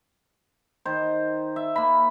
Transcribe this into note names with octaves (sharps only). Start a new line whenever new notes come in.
D#3 C5
E5
A#3 B5